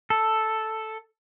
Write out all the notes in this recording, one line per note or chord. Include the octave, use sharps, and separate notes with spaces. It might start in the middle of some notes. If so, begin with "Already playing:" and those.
A4